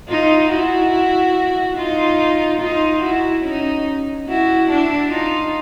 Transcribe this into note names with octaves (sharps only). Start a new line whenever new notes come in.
D#4 F4
E4 F#4
D#4 F4
D#4 F4
E4 F#4
C#4 D#4
E4 F#4
D4 E4
D#4 F4